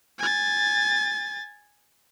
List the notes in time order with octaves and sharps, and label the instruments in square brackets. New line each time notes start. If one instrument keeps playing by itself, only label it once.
[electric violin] G#5 A6